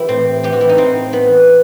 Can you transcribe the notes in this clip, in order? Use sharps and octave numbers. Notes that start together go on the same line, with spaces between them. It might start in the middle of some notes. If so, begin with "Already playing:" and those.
Already playing: E3 E4 G4
A2 C4
E3 G4
F#4
E4
D#4
A2 C4
E3 B3